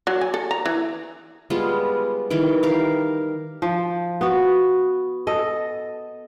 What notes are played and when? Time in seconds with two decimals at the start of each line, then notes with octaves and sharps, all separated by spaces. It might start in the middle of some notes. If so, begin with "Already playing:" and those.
0.07 F#3
0.21 G#5
0.34 A4
0.51 A#5
0.66 E3
1.50 G3 G#3 B3 F4
2.30 D#3 E3 G3
2.63 G4 A#4 F5
3.62 F3
4.21 B3 F#4
5.27 A4 D#5